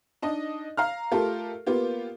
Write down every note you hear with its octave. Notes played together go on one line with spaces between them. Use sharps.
D4 D#4 D#5
F5 A#5 F6
A3 F4 G4 A4 A#4
A#3 B3 F4 G4